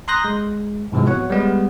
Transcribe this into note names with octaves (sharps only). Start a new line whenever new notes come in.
A#5 C6 D#6 F#6 G6 A#6
G#3
G#2 C3 E3 F3 G#3
B3 F#4 C#5 F#5
G3 G#3 B3